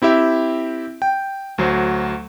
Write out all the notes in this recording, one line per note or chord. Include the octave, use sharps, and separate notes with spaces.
C4 E4 G4 E5
G5
D2 F#3 C5